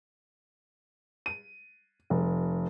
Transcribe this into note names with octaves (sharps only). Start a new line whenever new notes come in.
D#7
F1